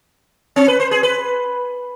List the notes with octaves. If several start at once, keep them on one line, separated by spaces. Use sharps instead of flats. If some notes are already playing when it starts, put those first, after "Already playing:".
C4
B4
C5
G#4
B4